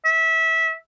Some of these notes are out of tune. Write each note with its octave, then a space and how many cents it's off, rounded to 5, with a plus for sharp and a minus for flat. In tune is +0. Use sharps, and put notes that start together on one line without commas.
E5 -20